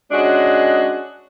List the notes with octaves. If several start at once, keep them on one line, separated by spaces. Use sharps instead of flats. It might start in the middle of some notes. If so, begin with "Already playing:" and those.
G#3 C#4 D4 F#4 G#4 D#5